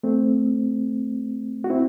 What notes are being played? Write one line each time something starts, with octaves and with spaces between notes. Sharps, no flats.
A3 C4
F#4
C4 E4